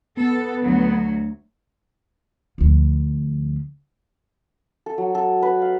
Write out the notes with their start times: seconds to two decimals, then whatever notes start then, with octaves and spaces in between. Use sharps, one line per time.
0.17 B3 A4
0.61 D2 F#3
2.58 D2 F3
4.86 A4
4.98 F#3
5.15 A4
5.42 B4
5.62 F5